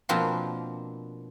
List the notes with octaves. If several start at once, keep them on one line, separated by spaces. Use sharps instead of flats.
B2 F3 A#3 C4 D4 C6